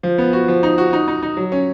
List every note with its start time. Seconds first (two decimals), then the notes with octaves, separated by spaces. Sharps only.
0.03 F3
0.18 B3
0.33 F#4
0.48 F3
0.63 D#4
0.78 F#4
0.93 D#4
1.08 D#4
1.22 D#4
1.37 F#3
1.52 C#4